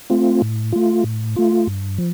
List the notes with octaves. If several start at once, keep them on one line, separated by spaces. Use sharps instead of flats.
A3 C4 F4
A2
A3 F4
A2
A3 F4
G2
F3